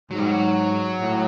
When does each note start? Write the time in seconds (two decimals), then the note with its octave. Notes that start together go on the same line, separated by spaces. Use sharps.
0.11 G#2 F#3
0.18 G3
0.26 F#3
1.01 A2